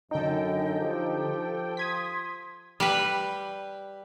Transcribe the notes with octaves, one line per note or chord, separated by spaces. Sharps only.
F#2 D3 D#4 A4 D#5 G5
F3 G4
C6 D#6 G#6 B6
G3 B4